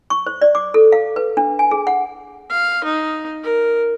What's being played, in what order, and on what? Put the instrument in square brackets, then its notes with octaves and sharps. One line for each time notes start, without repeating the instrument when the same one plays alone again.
[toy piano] C#6
C5
D5
D6
A4
F5
B4
D4
G#5
G#4
F#5
[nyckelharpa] F5
D#4
A#4